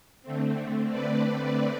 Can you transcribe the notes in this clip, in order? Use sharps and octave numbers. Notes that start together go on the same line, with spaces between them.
D3 A3 C4
B4 D5